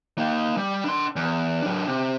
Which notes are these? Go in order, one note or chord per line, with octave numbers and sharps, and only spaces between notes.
A#3 D#4
G3
D4 C6
E2
F#3 D4
C3